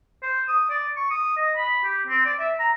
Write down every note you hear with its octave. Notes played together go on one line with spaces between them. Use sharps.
C5
D#6
D5
C#6
D#6
D#5
B5
G4
C4
D5
E5
A#5